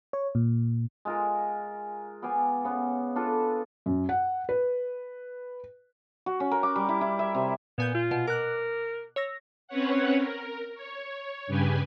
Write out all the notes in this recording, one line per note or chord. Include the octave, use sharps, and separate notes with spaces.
C#5
A#2
G#3 F4 A#4
B3 D5 F5 G#5
C#3 B3
D4 F4 A4 B4
F#2
F#5
B4
F#4
C#4
A#4
D6
G3
E4
E4
E5
C3
A#2 B3 G#5 G6
F4
B2
A#4 D6 F#6
C#5 E6 A#6
C4 C#4 B4 C#5 F#5
A#4
C#5
G2 C#3 G4 B4 G#5